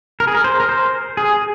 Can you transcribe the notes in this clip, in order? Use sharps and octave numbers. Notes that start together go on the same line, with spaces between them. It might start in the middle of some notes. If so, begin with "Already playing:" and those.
A#4
G#4
A#4
C5
A#4
C5
G#4